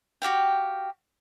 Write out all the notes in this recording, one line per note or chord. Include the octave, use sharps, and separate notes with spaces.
F#4 G4 F5 G5